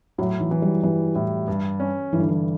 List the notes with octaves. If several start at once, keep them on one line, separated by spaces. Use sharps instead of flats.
A2 F#3
E3
E3
G3
E3 G3
A2
G2
C#4
G2 E3
D3
E3